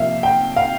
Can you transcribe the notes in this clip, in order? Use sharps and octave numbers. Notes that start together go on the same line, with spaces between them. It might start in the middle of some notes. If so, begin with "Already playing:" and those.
Already playing: C3 F3 A#3 E5 F5
G5
F5